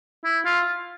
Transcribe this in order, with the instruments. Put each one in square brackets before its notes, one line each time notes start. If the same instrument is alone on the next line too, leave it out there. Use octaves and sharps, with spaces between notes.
[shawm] E4
F4